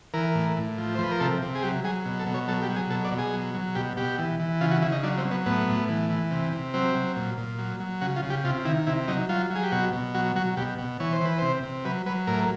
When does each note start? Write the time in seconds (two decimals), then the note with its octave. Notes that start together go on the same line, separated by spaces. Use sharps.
0.14 E3 A#4
0.35 A2
0.56 A2
0.78 F3
0.95 C5
0.99 F3 B4
1.12 A#4
1.20 C3 A4
1.42 C3
1.55 G#4
1.63 F#3 G4
1.84 F#3 G#4
2.05 B2
2.20 A4
2.26 B2
2.34 C#5
2.48 F#3 A4
2.62 G4
2.69 F#3
2.76 G#4
2.90 B2 A4
3.05 D5
3.12 B2
3.18 G#4
3.33 F#3
3.54 F#3
3.75 B2 G4
3.97 B2 G4
4.18 E3
4.40 E3
4.61 C#3 F4
4.71 F#4
4.82 C#3 E4
4.92 D#4
5.03 F#3 D4
5.18 C4
5.25 F#3
5.31 B3
5.46 A2 B3
5.68 A2
5.89 E3
6.10 E3
6.31 C3
6.53 C3
6.74 F#3 C4
6.95 F#3
7.16 A#2
7.38 A#2
7.59 F#3
7.80 F#3
8.01 C#3 F#4
8.16 F4
8.23 C#3
8.30 G4
8.44 C3 F4
8.65 D#3 E4
8.87 C3 E4
9.08 F#3 D#4
9.29 F#3 F4
9.50 F#3
9.55 G#4
9.63 G4
9.72 B2 F#4
9.93 B2
10.14 F#3 F#4
10.36 F#3 F#4
10.57 B2 G4
10.78 B2
11.00 E3 C#5
11.13 C5
11.21 E3 B4
11.38 C3 C5
11.63 C3
11.85 F#3 B4
12.06 F#3 B4
12.27 A2 A#4